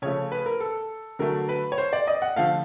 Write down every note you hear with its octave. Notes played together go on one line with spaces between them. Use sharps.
C#3 F3 A3 C#5
B4
A#4
A4
D3 F#3 A3 A#4
B4
C#5
C5
D5
D#5
F#5
D3 F3 A3 F5